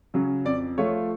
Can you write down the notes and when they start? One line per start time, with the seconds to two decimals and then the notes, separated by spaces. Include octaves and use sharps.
0.14 C#3 F#3 C#4
0.45 F2 D5
0.78 F3 A3 F4 C#5